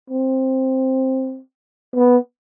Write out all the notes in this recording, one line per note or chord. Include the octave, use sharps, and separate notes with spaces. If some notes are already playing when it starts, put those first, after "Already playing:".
C4
B3